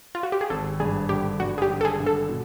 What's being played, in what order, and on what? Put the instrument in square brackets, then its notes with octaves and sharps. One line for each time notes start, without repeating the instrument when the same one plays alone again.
[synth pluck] F4
F#4
G4
G#4
[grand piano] G#1 [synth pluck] A4
[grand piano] G2 [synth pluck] G#4
[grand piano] D3 [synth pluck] G4
[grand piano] G2 [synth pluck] F#4
[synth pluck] G#4
G4
[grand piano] D3
[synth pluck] A4
G#4
[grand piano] D3
[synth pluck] A4
[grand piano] B2